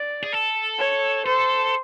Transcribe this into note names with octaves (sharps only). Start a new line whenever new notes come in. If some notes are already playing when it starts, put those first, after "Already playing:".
Already playing: D5
G#4
A4
C#5
A4 C5